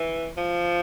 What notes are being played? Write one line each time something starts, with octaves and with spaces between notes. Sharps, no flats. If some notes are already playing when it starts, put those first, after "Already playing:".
Already playing: E3
F3